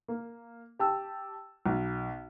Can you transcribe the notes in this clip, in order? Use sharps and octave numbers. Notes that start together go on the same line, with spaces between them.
A#3
G4 A5 E6
B1